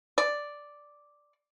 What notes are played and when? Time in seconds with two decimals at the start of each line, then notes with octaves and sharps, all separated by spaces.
0.18 D5